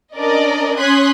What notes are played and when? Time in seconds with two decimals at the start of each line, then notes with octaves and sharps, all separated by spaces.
0.17 C#4 D4 A#4 D5 D#5
0.78 C#4 C6 D#6 F#6 G#6 B6